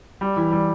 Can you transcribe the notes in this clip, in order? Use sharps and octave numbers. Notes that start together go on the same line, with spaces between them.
G3
E3
G3